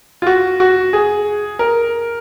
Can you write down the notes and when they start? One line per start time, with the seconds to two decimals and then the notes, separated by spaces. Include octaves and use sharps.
0.22 F4
0.27 F#4
0.60 F#4
0.93 G#4
1.59 A#4